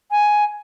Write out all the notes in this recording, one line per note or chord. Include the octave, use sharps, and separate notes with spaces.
G#5